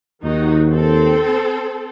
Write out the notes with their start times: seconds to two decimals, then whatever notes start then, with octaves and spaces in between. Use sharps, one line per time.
0.24 D#2 D#3 D#4 F#4
0.70 C4 A4